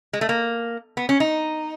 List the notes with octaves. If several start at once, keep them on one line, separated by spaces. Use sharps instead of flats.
G#3
A3
A#3
B3
C#4
D#4